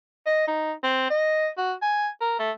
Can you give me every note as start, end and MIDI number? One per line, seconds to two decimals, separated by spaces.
0.26 0.47 75
0.47 0.72 63
0.83 1.06 60
1.10 1.48 75
1.58 1.73 66
1.82 2.08 80
2.21 2.37 70
2.39 2.51 57